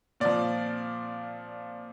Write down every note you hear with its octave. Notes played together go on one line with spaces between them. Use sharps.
A#2 F3 D5